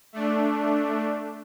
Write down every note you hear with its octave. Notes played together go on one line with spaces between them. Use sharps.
A3 D4